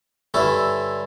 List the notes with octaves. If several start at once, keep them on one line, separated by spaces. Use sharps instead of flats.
G2 D3 C#4 E4 A4